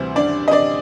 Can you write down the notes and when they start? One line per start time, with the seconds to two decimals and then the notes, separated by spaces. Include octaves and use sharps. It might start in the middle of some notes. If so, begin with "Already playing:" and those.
Already playing: D2 C3 E3 G3 C5
0.16 D4 D5
0.48 D#5
0.51 D4 D5